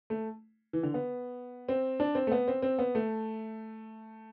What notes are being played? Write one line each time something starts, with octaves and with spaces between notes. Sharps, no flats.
A3
E3
D3
B3
C4
D4
C4
A3
B3
C4
C4
B3
A3